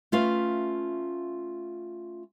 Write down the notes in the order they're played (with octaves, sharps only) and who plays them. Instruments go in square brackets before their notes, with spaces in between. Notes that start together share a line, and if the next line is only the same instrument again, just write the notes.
[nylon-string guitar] A3 C#4 F4 B4 E5 F5